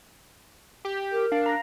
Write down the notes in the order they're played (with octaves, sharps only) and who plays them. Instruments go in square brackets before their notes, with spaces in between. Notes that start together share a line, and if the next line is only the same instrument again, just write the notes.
[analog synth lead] G4
[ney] A#4
[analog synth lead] D4 [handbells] F5
[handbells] A#5 A#6